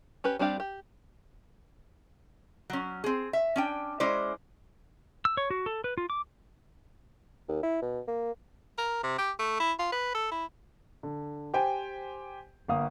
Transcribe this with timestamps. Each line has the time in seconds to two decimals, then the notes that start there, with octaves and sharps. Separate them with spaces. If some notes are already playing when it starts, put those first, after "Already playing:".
0.24 C#4 G4 B4
0.39 G3 C4 D4 G4 F5
0.60 G4
2.70 F#3 C#4
3.04 C4 G#4
3.33 E5
3.56 C#4 D4 G5
4.00 G#3 C#4 E4 C5 D5
5.25 E6
5.37 C#5
5.50 F#4
5.66 A4
5.84 B4
5.98 F4
6.10 D6
7.48 D#2
7.63 E4
7.82 B2
8.08 A#3
8.78 A#4
9.04 C3
9.19 G4
9.39 A3
9.60 E4
9.79 F4
9.92 B4
10.15 A4
10.32 E4
11.03 D3
11.54 G4 C5 G5 G#5
12.68 G1 A#3 F5 D#6